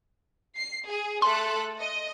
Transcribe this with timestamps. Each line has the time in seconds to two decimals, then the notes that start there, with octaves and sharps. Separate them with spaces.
0.56 C7
0.87 G#4
1.22 A3 A4 C6 F#6
1.79 D#5